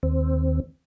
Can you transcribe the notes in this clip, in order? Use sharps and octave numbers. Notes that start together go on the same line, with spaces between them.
D#2 C4